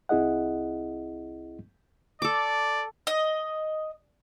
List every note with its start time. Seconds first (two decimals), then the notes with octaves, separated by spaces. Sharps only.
0.09 C2 C4 E4 G#4 D#5 F#5
2.22 A4 D5 D6
3.07 D#5